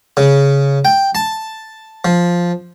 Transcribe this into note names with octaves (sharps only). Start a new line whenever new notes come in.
C#3
G5
A5
F3